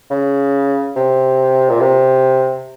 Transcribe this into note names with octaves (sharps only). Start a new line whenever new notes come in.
C#3
C3
A#2
C3